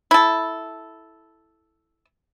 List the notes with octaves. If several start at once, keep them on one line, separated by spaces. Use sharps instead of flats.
E4 A4